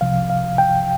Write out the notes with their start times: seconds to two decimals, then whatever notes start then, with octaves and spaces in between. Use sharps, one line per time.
0.01 C2 C3 F3 F5
0.30 F5
0.58 G5